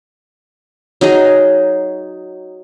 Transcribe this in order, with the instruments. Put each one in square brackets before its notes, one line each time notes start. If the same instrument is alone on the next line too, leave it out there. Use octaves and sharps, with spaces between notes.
[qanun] F#3 D#4 G#4 D#5